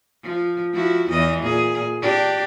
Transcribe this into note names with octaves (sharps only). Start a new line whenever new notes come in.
F3
F3 E4 F#4
E2 E3 D#5
A#2 G#4
D4 G4